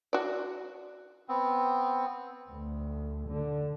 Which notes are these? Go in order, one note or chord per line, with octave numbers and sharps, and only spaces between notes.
F#4 D5
B3 C4
D2
D3